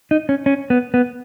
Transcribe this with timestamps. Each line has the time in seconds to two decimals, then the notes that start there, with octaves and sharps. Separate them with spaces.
0.11 D#4
0.29 C#4
0.46 C#4
0.70 B3
0.94 B3